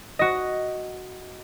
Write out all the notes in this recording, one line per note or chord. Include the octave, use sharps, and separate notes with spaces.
F#4 D#5